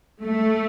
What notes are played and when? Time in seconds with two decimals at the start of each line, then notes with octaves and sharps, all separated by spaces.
0.23 A3